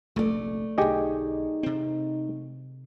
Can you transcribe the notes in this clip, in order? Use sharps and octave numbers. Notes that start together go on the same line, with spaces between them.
F1 A#1 A3 D5
B1 D3 D#4 G4 G#4 D#5
C3 C4